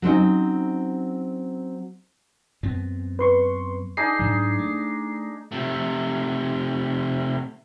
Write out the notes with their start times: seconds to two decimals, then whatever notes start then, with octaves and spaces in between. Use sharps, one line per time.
0.02 F#3 C4 C#4 D#4
2.63 F#2 B3 C4
3.19 B4 C6 C#6
3.97 D4 D#4 G#4 C7
4.19 G#2 F#3
4.59 A3
5.52 C3 A3